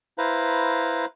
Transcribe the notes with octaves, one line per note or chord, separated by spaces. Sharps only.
E4 B4 C5 F5 A#5